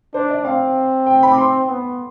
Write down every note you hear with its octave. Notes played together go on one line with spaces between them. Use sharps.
D4 C5
D5
C4 F5
G5
B5
D6
C6
B3